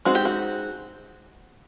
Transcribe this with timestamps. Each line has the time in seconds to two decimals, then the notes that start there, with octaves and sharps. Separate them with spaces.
0.05 G#3 C4 D#4 F#4
0.15 G4
0.25 F#4